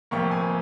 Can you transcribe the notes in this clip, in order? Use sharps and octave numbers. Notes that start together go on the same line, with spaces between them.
F1 F2 C3 F3 A#3 C#6
G#5